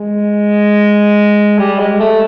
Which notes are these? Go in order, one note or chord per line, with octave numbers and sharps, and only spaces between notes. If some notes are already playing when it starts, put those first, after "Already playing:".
Already playing: G#3
G3
G#3
A3